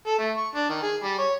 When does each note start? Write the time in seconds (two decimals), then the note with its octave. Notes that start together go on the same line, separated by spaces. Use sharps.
0.07 A4
0.18 A3
0.37 C#6
0.55 D4
0.69 D#3
0.82 G#4
1.03 G3
1.19 C#5